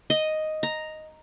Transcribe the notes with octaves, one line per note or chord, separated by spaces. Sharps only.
D#5
A#5